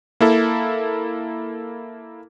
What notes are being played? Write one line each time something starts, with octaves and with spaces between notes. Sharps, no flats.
A#3 E4 A4